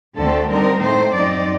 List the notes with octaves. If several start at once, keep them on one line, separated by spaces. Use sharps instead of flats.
D2 D3 A3 C4 A4
D3 G3 C4 D#4 A#4
A2 A3 C4 C5
F#2 F#3 C4 D#4 D5